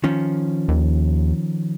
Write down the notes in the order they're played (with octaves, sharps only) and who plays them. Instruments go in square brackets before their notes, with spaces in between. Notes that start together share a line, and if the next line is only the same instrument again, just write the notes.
[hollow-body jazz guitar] D#3 F3 C#4
[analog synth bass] D#2